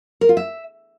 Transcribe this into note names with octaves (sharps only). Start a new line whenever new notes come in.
A#4
F4
E5